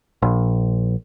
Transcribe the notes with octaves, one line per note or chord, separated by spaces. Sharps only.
A#1